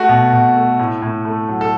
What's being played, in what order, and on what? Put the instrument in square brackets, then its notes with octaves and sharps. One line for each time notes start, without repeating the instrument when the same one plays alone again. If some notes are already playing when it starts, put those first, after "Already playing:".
Already playing: [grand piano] A3 F#4
B2
B2
A3
A2
A2
A3
F#3
A4